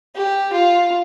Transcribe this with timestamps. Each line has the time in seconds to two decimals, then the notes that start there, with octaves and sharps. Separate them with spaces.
0.15 G4
0.53 F4